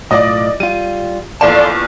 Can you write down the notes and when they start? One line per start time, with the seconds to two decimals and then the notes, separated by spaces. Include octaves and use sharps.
0.11 B1 A2 F4 D5 D#5
0.60 G3 F4 D#7
1.41 A#1 E2 A4 D5 F5 A5 C6 E7